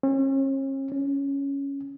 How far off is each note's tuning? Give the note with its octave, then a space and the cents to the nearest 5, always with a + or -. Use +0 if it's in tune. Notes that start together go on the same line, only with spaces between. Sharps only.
C#4 -40
C#4 +5